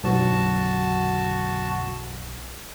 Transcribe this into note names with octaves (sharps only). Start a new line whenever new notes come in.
B1 F#2 B2 D3 F#4 A5